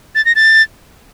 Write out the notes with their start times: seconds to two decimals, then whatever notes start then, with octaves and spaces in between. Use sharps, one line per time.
0.15 A6
0.25 A#6
0.36 A6